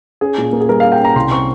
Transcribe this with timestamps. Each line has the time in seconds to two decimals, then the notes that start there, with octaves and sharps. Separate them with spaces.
0.21 C#4 G#4
0.38 A#2
0.53 A#3
0.61 G#4
0.69 G3 A#4
0.80 C#4 F5
0.92 G5
1.00 C#4 A#5
1.16 C2 C6
1.31 C4 C#6